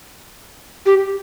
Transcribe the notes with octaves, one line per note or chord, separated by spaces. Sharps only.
G4